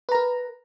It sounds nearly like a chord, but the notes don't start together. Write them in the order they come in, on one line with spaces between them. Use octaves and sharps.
B4 A#5 A#4